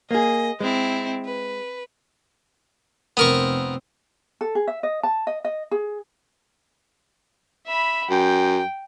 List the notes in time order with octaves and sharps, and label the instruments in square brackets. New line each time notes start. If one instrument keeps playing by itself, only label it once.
[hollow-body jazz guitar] A#3 G#4 [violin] D#5
[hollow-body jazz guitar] G#3 [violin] C4 E4
[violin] B4
[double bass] F1 C4 [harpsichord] B3 A#4 C#6
[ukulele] A4
G#4
E5
D#5
A5
D#5
D#5
G#4
[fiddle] E5 B5
[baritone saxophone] F#2 [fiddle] G5